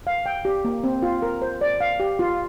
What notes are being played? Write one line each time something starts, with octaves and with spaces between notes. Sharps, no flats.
F5
G5
G4
A#3
C4
F4
A#4
C5
D5
F5
G4
F4